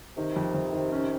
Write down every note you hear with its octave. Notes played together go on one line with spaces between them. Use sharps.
C3 D#3
F2
F2
D#3
C#4